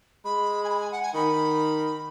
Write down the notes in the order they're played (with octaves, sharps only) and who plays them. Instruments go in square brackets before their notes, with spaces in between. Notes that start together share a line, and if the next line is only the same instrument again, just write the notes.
[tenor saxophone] G#3 [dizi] B5
[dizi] G#5
B5
G#5
F#5
G#5
[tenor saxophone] D#3 [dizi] B5